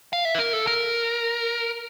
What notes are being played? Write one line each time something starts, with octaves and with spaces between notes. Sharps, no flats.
F5
E5
B4
A#4
A4
A#4